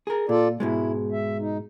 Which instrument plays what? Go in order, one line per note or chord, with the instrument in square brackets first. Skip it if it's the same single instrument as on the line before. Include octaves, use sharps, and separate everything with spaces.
[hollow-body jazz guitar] G#4 A#4
[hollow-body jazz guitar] A#2 [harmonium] F4 A4 D5
[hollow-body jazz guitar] G#2 B2 G#3 [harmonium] E4
[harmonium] E5
D#4